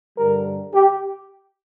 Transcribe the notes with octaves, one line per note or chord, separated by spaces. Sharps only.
G2 D3 G3 A#4
G4